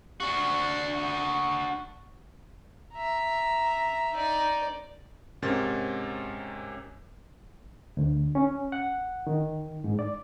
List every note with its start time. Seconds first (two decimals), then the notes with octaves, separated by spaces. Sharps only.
0.20 D4 F#4
2.94 E5 A#5
4.13 D#4 D5
5.42 G#2 C3 C#4 A#4 A6
7.97 D2
8.35 C#4
8.72 F#5
9.27 D#3
9.84 G#2
9.99 D5